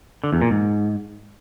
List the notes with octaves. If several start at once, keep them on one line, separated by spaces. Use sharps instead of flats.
D3
E2
A#2
G#2